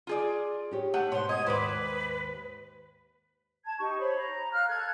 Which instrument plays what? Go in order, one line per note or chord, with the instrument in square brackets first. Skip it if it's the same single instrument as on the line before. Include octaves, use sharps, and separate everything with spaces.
[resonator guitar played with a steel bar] F4 G#4 D5
[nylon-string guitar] D#4 G4 C#5
[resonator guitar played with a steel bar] A3 [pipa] F#5
[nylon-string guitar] G#2 B2 [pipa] C#5 [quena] C6
[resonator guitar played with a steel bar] D#5 [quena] G#6
[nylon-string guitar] D#2 G#2 [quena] B4 [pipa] C5 D5
[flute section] A5 G#6
D#4 G4 C#6
C5 C#5 B5
A#5
F5 F6 F#6
A4 F#6 G#6